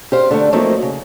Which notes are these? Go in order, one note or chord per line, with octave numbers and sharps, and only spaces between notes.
G4 C5 F5
D3 A3
F3 F#3 A3 A#3 C4 D#4
C#3